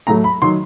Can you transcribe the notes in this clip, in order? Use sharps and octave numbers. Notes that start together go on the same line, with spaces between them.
A2 F#3 A3 A#5
B5
D#3 F#3 C6